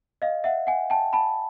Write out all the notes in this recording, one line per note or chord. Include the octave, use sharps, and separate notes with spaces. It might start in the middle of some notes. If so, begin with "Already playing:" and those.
D#5 F5
E5 F#5
F#5 G#5
G5 A5
A5 B5